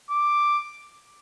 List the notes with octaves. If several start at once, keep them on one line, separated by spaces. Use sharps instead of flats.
D6